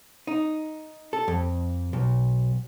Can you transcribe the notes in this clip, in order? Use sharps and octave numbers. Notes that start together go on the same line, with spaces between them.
D#4
A4
F2
B1